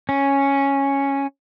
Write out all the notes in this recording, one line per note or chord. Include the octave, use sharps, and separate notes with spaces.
C#4